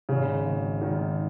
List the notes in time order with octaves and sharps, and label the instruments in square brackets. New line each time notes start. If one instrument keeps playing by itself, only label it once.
[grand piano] G#1 [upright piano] C#3
[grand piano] G#1
[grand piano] G#1 [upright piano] D#3